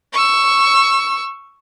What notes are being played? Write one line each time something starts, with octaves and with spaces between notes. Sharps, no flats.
C#6 E6